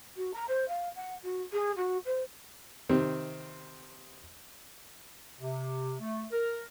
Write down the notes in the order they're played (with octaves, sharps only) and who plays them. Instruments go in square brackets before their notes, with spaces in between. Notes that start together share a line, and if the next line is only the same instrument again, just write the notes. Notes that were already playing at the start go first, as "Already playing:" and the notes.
[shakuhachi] F#4
A#5
C5
F5
F#5
F#4
G#4
F#4
C5
[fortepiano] C3 D#3 C4
[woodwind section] C3
A3
A#4